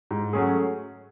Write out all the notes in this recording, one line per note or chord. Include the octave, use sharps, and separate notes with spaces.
G#2
F#3 A3 C#4 G#4